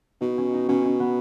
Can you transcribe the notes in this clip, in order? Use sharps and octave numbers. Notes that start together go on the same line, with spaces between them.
B2 D#4
C#4
D#4
B2 C#4
C#4
B3